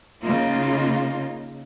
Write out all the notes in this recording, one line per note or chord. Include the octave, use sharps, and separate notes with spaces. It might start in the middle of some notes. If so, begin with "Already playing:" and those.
C#3 A#3 D#4 F4